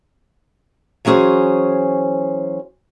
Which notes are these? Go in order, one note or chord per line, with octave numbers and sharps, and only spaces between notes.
E3 F#3 C#4 G#4 C5